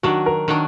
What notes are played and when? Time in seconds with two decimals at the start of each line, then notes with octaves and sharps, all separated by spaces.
0.03 D#3 F#3 D4 F#4
0.26 A#4
0.48 D#3 F#3 D4